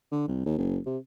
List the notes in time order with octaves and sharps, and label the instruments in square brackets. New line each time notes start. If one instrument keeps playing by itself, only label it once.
[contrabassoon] D3
C2
D#2
F#1
C3